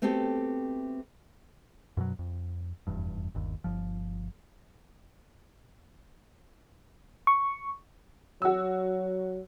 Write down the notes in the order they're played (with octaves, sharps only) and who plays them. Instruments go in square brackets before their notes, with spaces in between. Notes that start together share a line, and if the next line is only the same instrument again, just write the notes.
[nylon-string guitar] A3 B3 C4 F#4 G4 A4
[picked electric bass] F#2 B2 F3 F#3
F2
F1 E2 G2
G1 D#2
G1 F3
[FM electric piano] C#6
[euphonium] F#3 [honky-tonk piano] F#4 E6